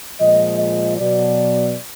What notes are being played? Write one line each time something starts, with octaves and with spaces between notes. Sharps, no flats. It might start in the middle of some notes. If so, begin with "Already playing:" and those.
A#2 F3 G#3 D#5
D#5
B2 F#3 D5